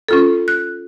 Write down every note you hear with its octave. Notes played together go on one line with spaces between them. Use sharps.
C#4 F4 A4
F#6